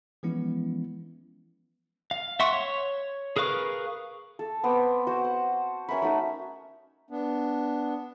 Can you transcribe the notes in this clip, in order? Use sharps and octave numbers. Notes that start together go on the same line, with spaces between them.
E3 F3 G#3 B3 C#4 E4
F5
E5 F#5 C6 C#6
C#5
G#4 A#4 B4 F5 C#6
A4
B3 C4 D6
F#4 C5
F#5
C#4 A#4 E5 B5
A3 D#4 F#4
B3 D4